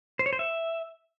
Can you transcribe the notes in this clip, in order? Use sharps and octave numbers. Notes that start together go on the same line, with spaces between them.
C5
C#5
C5
E5